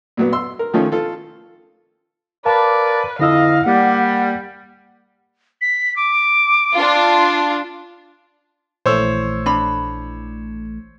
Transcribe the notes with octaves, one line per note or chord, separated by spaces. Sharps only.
A#2 F#3 B3
C6 E6
A#4
D#3 F3 A3 C#4 F4
F4 A4
A#4 B4 D5 F5 A5
F2 D3 E4 D#5 F5 E6
G3 A#3 F#5
B6
D6
D4 F4
A#1 E3 A3 C5 C#5 E6
D4 B5